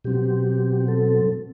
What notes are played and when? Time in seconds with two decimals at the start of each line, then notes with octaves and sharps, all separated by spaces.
0.04 B2 F#3 C4 G4
0.88 A4